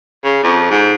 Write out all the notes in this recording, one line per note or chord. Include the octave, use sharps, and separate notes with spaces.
C#3
F2
G#2